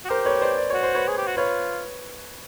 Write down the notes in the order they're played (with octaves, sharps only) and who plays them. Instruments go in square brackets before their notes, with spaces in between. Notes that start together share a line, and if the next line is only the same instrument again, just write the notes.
[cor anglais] F#4
[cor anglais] G4 [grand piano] A#4 C5
[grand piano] B4 C#5
C5 D5
D5
[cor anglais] F#4 [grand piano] C#5
[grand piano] C5
B4 C#5
[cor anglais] G#4
G4
F#4
[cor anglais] F4 [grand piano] B4 C#5